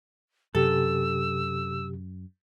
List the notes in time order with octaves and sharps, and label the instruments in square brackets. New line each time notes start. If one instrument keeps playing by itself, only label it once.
[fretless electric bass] F#2 [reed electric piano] C3 G4 [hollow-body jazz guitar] A4 [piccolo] E6